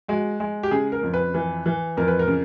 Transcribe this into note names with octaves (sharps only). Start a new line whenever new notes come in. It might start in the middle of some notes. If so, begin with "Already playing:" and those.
G#3 F#4
G#3
G4
C#3 G#4
A#4
F2
B4
E3
E3
F2 A#4
B4
A#4
C#3